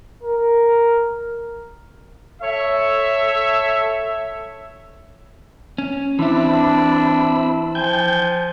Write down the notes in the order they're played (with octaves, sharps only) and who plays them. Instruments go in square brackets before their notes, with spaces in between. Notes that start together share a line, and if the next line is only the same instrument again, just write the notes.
[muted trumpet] A#4
[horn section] A4 C#5 E5
[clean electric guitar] C#4
[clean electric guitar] E3 E4 [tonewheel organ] C4 E5 B5 [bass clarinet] D4
[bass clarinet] F3 [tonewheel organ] G5 G#5 G6